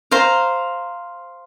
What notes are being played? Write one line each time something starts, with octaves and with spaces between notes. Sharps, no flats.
C5 F5 A#5